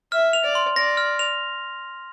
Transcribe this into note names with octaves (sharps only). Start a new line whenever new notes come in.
E5 F6
F7
D5
C6
D5 A#6
F6
F7